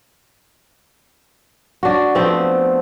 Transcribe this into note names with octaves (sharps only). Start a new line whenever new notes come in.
D4 F#4
F3 A3 B3 C4